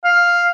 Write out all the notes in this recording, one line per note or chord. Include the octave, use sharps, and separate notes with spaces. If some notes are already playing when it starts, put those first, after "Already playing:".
F5